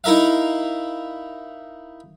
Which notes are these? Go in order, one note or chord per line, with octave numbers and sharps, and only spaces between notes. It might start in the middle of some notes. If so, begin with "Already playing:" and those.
D#4 E4 A#4 E5 F5